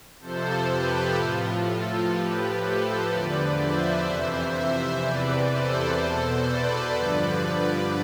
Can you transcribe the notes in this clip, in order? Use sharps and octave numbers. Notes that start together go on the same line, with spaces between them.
F2 C3 F3 A4 C5
G4 B4
A2 F3 F4
F4 A4
A2 F3 G4 B4
A4 C5
E2 D3 F3 B4 D5
C5 E5
F2 C3 E3
C5 E5
E2 C3 E3 B4 D5
A4 C5
E2 B2
B4 D5
G2 D3 F3